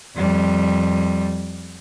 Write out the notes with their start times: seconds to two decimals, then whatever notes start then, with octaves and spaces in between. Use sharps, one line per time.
0.16 F2 G3